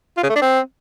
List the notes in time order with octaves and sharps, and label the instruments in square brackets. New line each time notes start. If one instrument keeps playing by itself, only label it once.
[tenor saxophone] F4
C#3
A3
D4
C4